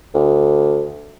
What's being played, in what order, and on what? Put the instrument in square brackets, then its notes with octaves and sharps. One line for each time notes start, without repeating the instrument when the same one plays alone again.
[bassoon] D2